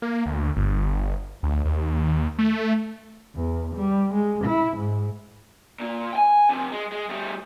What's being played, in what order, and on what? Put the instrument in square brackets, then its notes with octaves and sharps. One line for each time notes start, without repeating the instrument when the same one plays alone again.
[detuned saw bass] A#3
D2
G1
D2
D#2
A3
[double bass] E2
G3
G#3
E4
G#2
[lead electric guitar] A#2 A#3
G5 G#5
F2 C3
G#3
G#3
G3 A3